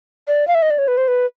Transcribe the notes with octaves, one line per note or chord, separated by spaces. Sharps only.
D5
F5
E5
D#5
D5
C#5
B4
C5
B4